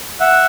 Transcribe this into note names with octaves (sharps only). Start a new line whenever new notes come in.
E5 F#5